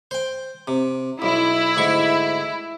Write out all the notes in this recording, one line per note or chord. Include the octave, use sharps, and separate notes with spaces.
C5 G5
C3
B1 E4
D2 G#2 C#6